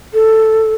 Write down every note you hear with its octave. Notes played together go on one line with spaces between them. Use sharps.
A4